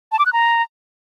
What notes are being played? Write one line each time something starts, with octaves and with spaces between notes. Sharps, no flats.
A5
D6
F#6
A#5